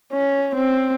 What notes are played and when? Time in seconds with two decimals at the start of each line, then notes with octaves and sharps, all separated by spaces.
0.13 C#4
0.55 C4